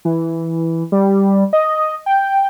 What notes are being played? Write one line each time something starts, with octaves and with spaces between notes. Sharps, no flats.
E3
G3
D#5
G5